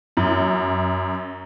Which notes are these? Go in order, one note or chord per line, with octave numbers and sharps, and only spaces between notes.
F#2